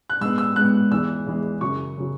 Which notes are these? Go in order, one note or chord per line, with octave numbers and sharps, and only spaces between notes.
F#6
G#2 G#3 B3 E6
E6
G#2 G#3 B3 F#6
E2 E3 G#3 E6
E2 E3 G#3
F#2 C#3 F#3 C#6
C#3 F#3